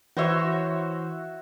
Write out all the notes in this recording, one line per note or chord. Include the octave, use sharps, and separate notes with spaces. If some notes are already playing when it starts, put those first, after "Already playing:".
E3 F#4 C5 C#5 E5